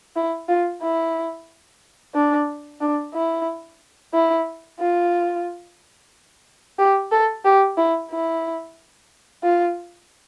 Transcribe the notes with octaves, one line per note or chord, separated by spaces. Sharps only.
E4
F4
E4
D4
D4
E4
E4
F4
G4
A4
G4
E4
E4
F4